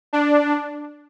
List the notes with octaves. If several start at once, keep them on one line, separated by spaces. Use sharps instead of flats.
D4